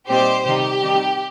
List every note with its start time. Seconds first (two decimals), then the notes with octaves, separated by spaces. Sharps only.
0.08 A#2 G3 C4 D#4 G4 C5
0.45 C3 D#3 G3 D#4 G4
0.82 D#3 G3 C4 D#4